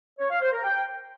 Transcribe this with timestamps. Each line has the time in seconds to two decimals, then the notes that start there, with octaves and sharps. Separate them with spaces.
0.19 C#5
0.30 F5
0.41 C5
0.52 A#4
0.63 G5